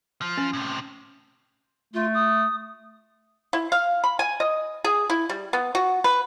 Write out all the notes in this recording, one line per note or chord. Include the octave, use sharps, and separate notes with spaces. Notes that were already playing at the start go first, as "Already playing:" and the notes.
F3
C#4
A2 C3
A3 F4
D#6
E4
F5
B5
G#5
D#5
G#4
E4
G3
B3
F#4
B4